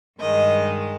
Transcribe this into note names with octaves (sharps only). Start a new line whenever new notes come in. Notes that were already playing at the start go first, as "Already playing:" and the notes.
G2 D#3 G#3 D#5